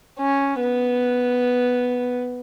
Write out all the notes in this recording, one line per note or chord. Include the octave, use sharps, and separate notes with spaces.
C#4
B3